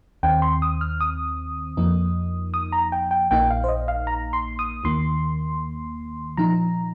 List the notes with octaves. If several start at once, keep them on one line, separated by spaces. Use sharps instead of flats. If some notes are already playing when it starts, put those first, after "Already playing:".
D#2 D#3 C4 G5
C6
D#6
F6
D#6
F2 F3 A#3 D#4
D#6
A#5
G5
G5
A#1 A#2 A#3 D#4 G5
F5
C5
D#5
F5
A#5
C6
D#6
D#2 D#3 A#3 C6
A#2 F3 D#4 A#5